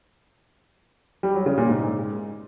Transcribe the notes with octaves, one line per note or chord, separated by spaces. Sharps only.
G3
F#3
C#3
A#2
G#2